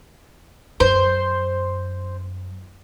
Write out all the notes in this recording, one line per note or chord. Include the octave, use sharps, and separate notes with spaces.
F#2 C5